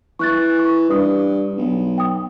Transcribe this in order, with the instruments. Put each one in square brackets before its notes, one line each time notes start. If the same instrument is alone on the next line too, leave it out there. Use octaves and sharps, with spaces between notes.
[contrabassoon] E3 [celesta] C#6 F#6 A6
[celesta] C#6
[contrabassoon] G2 [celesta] B4 D#6
[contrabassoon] B1
[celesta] G5 D#6